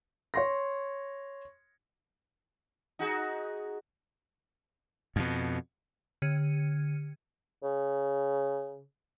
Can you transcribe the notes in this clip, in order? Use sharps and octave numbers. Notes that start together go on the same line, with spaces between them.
C#5 C6 A#6
D#4 F#4 G#4
F2 B2
D3 F6 G#6 C#7 D#7
C#3